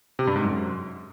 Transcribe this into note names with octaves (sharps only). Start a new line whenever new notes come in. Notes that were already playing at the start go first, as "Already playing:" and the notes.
C3
G2
G#2
F#2